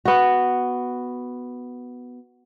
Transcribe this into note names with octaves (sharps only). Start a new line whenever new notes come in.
B3 F#4